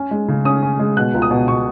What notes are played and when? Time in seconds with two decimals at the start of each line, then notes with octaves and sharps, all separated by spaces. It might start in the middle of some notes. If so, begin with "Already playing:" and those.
Already playing: C#4
0.11 G#3
0.28 C#3
0.45 C#4 D#6
0.63 C#4
0.79 G#3
0.97 B2 F#6
1.14 C#2
1.22 D#6
1.31 B2
1.48 B2 C#6